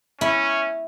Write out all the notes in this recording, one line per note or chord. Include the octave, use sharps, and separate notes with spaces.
C#4 E4